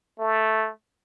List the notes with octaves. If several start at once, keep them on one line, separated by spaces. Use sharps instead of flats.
A3